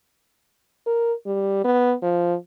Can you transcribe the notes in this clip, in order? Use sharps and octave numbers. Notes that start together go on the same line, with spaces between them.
A#4
G3
B3
F3